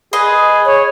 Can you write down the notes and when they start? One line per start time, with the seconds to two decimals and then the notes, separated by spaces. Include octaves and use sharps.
0.13 G#4 B4 D#5 C6
0.66 C#5